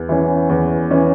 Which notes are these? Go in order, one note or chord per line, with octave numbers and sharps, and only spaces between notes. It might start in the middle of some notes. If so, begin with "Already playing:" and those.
Already playing: E2
E3 C#4
E2
E3 C#4